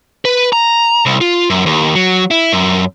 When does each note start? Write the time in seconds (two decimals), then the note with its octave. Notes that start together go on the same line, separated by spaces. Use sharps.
0.25 B4
0.53 A#5
1.06 C2
1.21 F4
1.50 F#2
1.66 D#2
1.95 F#3
2.31 E4
2.53 F#2